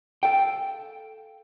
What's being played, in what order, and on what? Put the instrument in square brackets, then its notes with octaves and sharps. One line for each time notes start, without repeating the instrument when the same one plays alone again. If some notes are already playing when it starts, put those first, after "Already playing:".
[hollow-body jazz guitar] A4 F5 G5